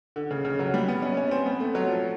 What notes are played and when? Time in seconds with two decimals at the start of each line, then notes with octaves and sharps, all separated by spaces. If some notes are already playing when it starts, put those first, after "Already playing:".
0.16 D3
0.31 C#3
0.45 C#3
0.59 F#3
0.74 G3
0.88 B3
1.02 C#4
1.17 C#4
1.31 C4
1.46 B3
1.60 A3
1.75 F#3
1.88 F3